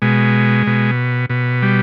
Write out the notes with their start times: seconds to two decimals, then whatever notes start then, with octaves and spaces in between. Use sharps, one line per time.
0.02 B2 G#3
0.67 B2
1.30 B2
1.62 G3